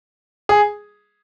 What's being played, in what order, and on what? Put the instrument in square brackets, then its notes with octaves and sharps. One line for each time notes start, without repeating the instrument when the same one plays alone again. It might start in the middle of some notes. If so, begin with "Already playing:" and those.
[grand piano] G#4